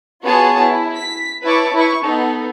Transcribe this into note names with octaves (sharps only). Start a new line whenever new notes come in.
B3 F4 F#4 G#4 C#5 A5
E4
B6
E4 B4 C#5 A5 C#6 D6
E4 B4 C#6
B3 D#4 A4